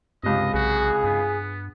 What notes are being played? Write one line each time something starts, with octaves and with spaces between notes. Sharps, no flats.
C#2 G2 C3 D#5
B1 F#4 G#4
G2 B3